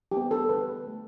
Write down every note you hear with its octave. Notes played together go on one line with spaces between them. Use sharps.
G3 B3 G4
A4
D3 B4
A3